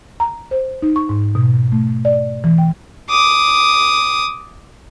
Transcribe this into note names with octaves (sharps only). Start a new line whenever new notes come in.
A#5
C5
D#4
C#6
G#2
B2
A3
D5
E3
G5
D6 D#6